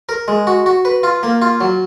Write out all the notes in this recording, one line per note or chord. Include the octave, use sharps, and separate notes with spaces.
A#4
G#3
F#4
F#4
B4
F4
A#3
F4
F#3